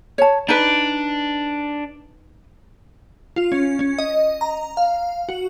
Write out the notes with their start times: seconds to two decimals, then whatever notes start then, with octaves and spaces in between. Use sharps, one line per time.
0.18 C#5 A5
0.48 D4 D#4 B4
3.36 F4
3.52 C#4
3.79 C#4
3.99 D#5
4.41 A#5
4.77 F5
5.29 F#4